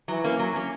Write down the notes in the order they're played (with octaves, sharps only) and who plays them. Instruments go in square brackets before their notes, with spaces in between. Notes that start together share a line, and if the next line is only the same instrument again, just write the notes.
[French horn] E3 [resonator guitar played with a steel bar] F#3
[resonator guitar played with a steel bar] A#3 C#4
F#3
A#3 C#4